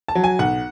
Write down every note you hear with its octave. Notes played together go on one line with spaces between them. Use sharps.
A5
F#3
G#5
B1 F#5